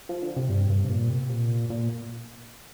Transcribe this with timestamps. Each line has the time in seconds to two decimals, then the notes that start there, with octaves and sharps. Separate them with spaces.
0.09 F3
0.22 D3
0.36 C3
0.49 G2
0.70 G2
0.84 C3
0.90 A#2
1.09 C3
1.29 A#2
1.70 A#2